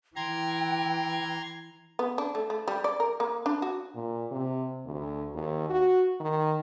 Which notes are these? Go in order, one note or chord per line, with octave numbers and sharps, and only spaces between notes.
E3 G5 A#5 C6 G#6
B3
D4
A3
A3
G3
D5
A#4
A#3
D4
F#4
A#2
C3
D2
D#2
F#4
D#3